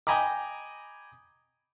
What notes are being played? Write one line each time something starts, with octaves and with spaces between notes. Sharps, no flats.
D#5 G5 G#5 A#5 B5 D6